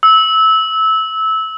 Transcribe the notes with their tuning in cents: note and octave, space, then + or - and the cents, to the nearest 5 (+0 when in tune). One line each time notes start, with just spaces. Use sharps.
E6 -20